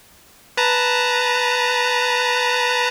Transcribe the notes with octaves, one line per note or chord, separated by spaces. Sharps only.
B4 A5 A#5